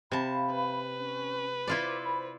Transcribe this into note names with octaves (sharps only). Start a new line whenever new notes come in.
C3 F5 A5 B5
B4
C#4
E4 F4 C5 D5 D6
C5 B5